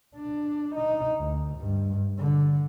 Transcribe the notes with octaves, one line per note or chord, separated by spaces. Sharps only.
D4
D#4
D2
G2
D3